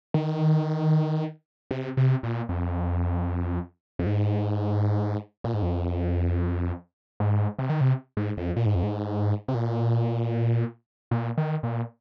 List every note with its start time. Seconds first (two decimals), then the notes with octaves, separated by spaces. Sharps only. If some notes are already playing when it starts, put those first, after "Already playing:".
0.14 D#3
1.71 C3
1.97 C3
2.23 A#2
2.49 F2
3.99 F2
4.06 G#2
5.44 A#2
5.54 G#2
5.62 F2
7.20 G#2
7.59 C3
7.69 D#3
7.81 C3
8.17 G#2
8.37 F2
8.56 A#2
8.66 G#2
8.75 F2
8.83 G#2
9.48 C3
9.55 A#2
11.11 A#2
11.37 D#3
11.63 A#2